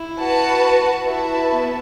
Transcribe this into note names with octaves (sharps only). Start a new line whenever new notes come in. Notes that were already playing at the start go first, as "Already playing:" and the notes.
Already playing: E4
F#4 B4 F#5 A5
E4 F#4 B4 E5 A5
B3